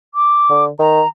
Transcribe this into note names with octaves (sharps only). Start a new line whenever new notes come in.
D6
D3
D#3 A#5